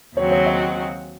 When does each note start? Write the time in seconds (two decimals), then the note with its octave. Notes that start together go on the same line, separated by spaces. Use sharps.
0.16 D#2 C#3 F#3 C4 F#4 C#5
0.31 C#5
0.46 D#5